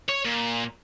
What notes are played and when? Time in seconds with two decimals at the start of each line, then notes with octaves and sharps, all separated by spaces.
0.09 C#5
0.25 A#2